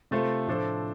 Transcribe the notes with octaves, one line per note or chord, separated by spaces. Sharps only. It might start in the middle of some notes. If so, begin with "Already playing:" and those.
C3 A3 F4 A4 C5
A2 F3 D4 A4 C5